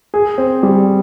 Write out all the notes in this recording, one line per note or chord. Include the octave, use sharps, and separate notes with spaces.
G#4
C4
G3